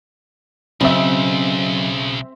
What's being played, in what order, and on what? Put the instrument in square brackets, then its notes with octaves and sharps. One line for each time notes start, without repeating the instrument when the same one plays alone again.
[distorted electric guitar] B1 [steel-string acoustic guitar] C#3 [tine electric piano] F#3 D#5 [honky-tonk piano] C4 E5